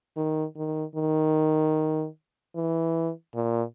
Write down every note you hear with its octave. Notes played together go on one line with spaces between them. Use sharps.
D#3
D#3
D#3
E3
A#2